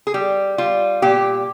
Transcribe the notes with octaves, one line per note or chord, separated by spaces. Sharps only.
G#4
G3 G4
G3 F4
A#2 G4